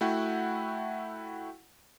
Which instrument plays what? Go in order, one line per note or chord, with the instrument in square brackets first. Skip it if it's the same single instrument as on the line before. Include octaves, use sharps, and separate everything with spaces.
[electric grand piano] A3 E4 F#4 F#5 G5